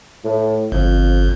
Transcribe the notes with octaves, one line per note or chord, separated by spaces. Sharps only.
A2
G1 F2